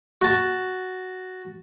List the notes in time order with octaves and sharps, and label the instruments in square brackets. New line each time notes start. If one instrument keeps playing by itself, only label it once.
[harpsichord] F#4 A5